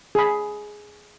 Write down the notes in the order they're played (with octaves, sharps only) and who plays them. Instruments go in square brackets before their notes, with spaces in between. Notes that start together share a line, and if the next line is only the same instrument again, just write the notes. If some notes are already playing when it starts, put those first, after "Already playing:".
[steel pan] G#4 B5